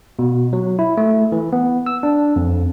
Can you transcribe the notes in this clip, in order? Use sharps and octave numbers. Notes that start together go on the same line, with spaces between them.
B2
F#3
E4
A3
E3
B3
E6
D4
F2